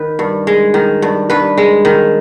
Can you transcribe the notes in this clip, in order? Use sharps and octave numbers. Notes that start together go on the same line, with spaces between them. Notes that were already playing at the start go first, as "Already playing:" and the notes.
Already playing: D#3 B4
G2
G#3
D#3
G2
G2 B4
G#3
D#3